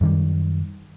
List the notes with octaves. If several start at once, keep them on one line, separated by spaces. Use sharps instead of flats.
F#2 D#3 G3